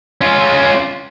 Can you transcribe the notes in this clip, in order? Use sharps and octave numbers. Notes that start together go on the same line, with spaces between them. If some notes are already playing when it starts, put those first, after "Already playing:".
C#4 F4